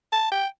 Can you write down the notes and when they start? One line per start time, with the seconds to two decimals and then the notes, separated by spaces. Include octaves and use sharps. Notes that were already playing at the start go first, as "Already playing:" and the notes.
0.13 A5
0.32 G5